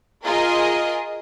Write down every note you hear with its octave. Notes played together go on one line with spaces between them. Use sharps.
F4 G#4 A#4 D#5